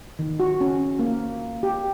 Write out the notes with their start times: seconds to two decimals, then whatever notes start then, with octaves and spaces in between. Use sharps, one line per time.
0.19 D#3
0.40 F#4
0.61 C#4
0.99 A#3
1.63 G4